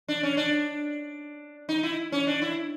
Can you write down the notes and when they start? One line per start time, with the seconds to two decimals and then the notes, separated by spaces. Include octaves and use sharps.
0.08 D4
0.23 C#4
0.37 D4
1.69 D#4
1.83 E4
2.12 C#4
2.27 D4
2.42 E4